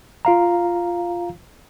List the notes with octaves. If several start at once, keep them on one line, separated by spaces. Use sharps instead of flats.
F4 F5 A#5